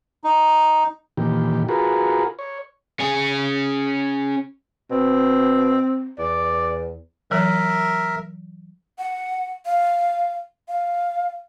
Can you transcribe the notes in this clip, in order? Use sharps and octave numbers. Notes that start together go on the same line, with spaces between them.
D#4
A#2 D#3 E3 G4
F4 F#4 G#4 A#4 B4
C#5
C#4 G#4
B2 C4
E2 D5
E3 F#3 A#4 E5
F#5
F5
F5